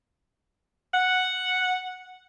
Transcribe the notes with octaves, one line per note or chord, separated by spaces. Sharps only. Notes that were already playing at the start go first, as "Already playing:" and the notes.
F#5